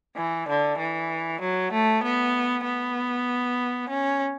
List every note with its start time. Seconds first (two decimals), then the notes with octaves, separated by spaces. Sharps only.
0.16 E3
0.48 D3
0.79 E3
1.41 F#3
1.72 A3
2.03 B3
2.65 B3
3.89 C#4